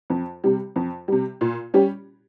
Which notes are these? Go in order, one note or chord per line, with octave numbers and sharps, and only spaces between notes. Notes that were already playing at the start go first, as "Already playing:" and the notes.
F2
C3 G3
F2
C3 G3
A#2
G3 C#4 G4